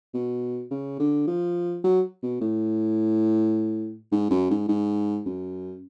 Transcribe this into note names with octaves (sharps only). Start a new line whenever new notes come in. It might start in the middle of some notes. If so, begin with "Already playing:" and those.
B2
C#3
D3
F3
F#3
B2
A2
G#2
F#2
G#2
G#2
F#2